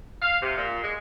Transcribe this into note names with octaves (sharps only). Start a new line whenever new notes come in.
F5
C3
A#2
G#3